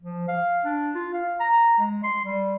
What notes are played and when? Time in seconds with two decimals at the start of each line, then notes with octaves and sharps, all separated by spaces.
0.02 F3
0.28 F5
0.65 D4
0.95 F4
1.13 F5
1.40 A#5
1.79 G#3
2.04 C6
2.25 G3